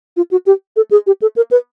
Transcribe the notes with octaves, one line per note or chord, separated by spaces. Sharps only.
F4
F#4
G4
A4
G#4
G4
A4
A#4
B4